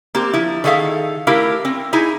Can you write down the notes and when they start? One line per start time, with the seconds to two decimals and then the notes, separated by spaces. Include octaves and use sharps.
0.15 A#3 C4 G4
0.33 F3 E4
0.64 D#3 G#4 A4 E5 F5
1.27 A3 E4 G4 A#4 F5
1.65 C4
1.93 D#4 E4 G#4